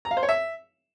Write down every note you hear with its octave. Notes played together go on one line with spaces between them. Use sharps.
A#5
F5
C5
C#5
E5